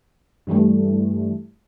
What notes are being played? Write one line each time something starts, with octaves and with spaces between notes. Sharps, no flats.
G2 E3 G3 A3